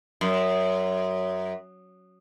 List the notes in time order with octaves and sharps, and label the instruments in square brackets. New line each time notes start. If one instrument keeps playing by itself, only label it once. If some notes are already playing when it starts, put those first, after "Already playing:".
[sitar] F#2